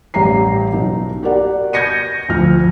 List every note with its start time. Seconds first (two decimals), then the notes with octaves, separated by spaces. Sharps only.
0.14 A1 G3 G4 A#5 C7
0.73 B1 D#4
1.22 F#4 G4 A#4 D5 F#5
1.73 G6 G#6 A#6 C#7 D#7
2.29 D2 F3 F6